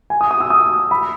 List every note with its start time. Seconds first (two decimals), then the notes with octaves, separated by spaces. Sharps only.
0.10 G#5
0.21 D#6
0.31 D#6
0.40 E6
0.50 D#6
0.91 B5